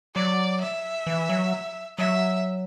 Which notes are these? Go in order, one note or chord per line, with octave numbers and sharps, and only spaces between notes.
F#3 D5
E5
E3
F#3
F#3 E5